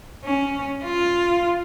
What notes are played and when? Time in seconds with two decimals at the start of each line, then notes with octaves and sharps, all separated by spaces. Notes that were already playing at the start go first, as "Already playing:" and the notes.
0.25 C#4
0.85 F4